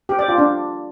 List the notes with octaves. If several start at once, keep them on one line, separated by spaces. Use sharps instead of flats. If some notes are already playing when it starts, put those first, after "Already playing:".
G4
D5
F4
D4